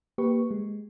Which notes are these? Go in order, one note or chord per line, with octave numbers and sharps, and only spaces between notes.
A#3 G4 B4 C#6
G#3